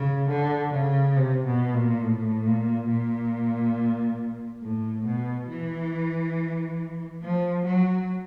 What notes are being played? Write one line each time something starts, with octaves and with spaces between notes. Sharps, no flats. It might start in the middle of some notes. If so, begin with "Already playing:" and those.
Already playing: C#3
D3
C#3
C3
B2
A#2
A2
A#2
A#2
A2
B2
E3
F3
F#3